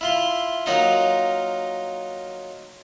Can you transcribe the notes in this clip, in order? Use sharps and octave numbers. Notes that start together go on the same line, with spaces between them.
E4 F4 C6
F#3 A#3 D#4 F4